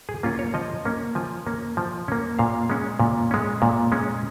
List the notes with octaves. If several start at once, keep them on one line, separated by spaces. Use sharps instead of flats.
G#4
A#3 C#4 F4
C#5
F3 D#5
A#3 C#4
F3 G#5
A#3 C#4
F3
A#3 C#4
A#2 F5
G#3 C#4
A#2
G#3 C#4
A#2
G#3 C#4